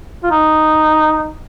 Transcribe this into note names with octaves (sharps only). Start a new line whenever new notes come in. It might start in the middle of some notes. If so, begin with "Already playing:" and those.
F4
D#4